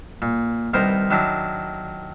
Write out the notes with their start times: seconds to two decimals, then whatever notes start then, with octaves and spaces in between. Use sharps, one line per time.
0.22 A#2
0.74 C2 D#3 B3 A#4 C5
1.10 D#3 F#3 D4 E4